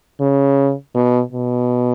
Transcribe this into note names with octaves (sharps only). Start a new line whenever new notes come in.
C#3
B2
B2